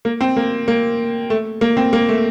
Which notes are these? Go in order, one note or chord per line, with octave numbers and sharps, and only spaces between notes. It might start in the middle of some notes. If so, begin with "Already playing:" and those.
A#3
C4
A#3
A#3
A3
A#3
C4
A#3
A3